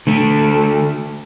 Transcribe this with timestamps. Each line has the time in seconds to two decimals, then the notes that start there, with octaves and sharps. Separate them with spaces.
0.07 D3 A3